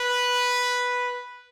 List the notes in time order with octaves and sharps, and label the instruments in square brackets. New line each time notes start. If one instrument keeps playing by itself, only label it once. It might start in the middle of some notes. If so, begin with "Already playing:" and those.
Already playing: [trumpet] B4